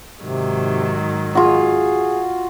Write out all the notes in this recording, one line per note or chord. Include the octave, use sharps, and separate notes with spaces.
G#2 C3 D#3 F#3
F4 F#4 G#4